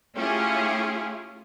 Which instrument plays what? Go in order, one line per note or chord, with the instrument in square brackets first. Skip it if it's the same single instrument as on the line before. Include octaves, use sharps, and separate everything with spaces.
[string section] A3 C#4 E4 F4 G4 G#4